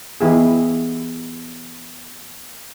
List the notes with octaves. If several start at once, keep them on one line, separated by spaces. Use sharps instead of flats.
E3 B3 D#4 E4 G4 G#4